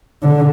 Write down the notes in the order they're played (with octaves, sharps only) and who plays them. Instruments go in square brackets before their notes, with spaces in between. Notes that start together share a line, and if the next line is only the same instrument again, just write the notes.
[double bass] D3